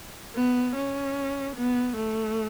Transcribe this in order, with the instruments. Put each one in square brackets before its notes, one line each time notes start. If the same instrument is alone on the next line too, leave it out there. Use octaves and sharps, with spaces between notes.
[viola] B3
C#4
B3
A3